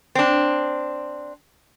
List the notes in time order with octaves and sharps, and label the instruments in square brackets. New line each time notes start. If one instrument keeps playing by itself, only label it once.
[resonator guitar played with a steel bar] C4 D4